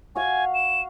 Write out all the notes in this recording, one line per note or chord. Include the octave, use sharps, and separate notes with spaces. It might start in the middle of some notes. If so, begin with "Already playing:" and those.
F#4 F5 G#5
E7